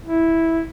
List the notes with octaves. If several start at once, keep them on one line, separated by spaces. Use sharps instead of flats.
E4